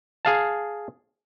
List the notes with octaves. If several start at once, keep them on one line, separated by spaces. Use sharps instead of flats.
G#4 F5 A5